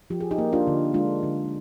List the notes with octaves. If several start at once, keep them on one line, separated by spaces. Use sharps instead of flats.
F3 G4
G#4
D#4 G4
A#3
D4 F4
D3
G#3 D4 F4
D3